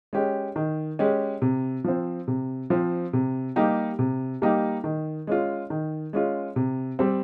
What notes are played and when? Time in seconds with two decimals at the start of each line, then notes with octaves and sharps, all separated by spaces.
0.13 G#3 C#4 G4
0.56 D#3
0.99 G#3 C#4 G4
1.42 C3
1.84 F3 C4
2.28 C3
2.70 F3 C4
3.13 C3
3.56 G3 A#3 D#4 G4
3.99 C3
4.42 G3 A#3 D#4 G4
4.84 D#3
5.27 G#3 C#4 F4
5.70 D#3
6.13 G#3 C#4 F4
6.56 C3
6.99 G3 C4